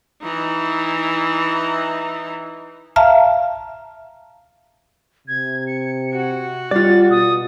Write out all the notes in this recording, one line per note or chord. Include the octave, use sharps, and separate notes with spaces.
E3 D#4
E5 F5 A5 A#5 F6
C3 G#6
C#7
F#4
G3 F4 D5 A6
B2 D#6